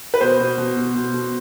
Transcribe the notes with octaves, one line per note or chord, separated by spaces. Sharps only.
B4
B2 C5
B2
B2
B2
B2
B2